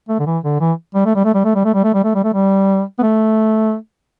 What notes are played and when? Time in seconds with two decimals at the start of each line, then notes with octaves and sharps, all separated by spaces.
0.09 A3
0.19 D3
0.26 E3
0.44 D3
0.60 E3
0.95 G3
1.05 A3
1.15 G3
1.25 A3
1.34 G3
1.45 A3
1.55 G3
1.65 A3
1.74 G3
1.84 A3
1.94 G3
2.04 A3
2.15 G3
2.24 A3
2.34 G3
2.98 B3
3.02 A3